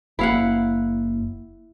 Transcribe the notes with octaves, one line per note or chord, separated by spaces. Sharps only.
F#1 A#3 E4 F5 F#5